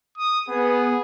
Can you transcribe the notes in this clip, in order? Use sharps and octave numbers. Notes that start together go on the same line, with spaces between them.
D#6
B3 G#4